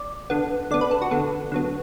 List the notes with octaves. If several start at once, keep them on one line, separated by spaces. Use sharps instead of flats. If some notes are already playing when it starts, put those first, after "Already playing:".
Already playing: D5
D3 B3
D3 B3 D5
B4
A4
F#4
D3 B3 A4
D3 F#3 B3